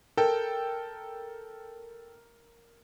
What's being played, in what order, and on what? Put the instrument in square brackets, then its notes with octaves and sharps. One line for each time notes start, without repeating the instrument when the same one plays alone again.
[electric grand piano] A4 G5 [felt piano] A#4